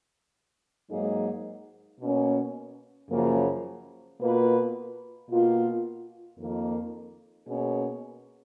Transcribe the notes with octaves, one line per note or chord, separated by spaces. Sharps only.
G#2 F#3 A#3 D#4 G#4
B2 A#3 C#4
F#2 C#3 F3 A#3
B2 A#3 F4 B4
B2 A#3 F4
F2 D#3 A#3
B2 A#3 C#4 G#4 C#5